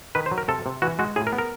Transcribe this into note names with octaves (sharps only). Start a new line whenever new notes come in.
D#3 B4
C5
F#3
A#4
C3 A4
C3
E3 F#4
G#3 F#4
A2 G#4
A#4
B3
A#4